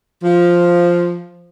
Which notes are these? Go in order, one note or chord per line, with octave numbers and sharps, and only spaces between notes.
F3